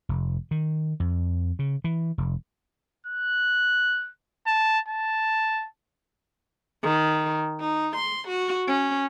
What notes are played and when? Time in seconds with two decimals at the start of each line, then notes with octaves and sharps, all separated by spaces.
0.09 F1
0.51 D#3
1.00 F2
1.59 C#3
1.84 E3
2.18 F1
3.07 F#6
4.46 A5
4.88 A5
6.83 D#3
7.60 D#4
7.96 C6
8.28 F#4
8.67 C#4